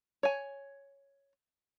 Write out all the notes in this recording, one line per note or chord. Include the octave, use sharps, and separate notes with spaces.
C#5 G#5